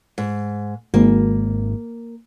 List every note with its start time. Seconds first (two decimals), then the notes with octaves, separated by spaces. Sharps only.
0.18 G#2
0.94 G#1 A#3